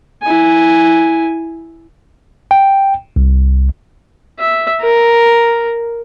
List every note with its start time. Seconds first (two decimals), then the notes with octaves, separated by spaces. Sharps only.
0.22 E4 G#5
2.51 G5
3.16 C2
4.39 E5
4.81 A#4